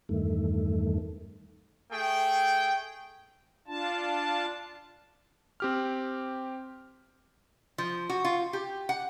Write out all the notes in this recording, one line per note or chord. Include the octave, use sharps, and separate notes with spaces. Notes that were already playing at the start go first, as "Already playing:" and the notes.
E2 G2 D#3 A3
A3 G#4 G5
D4 F4 A5
C4 G4 F6
F3
F#4
F4
G4
F#5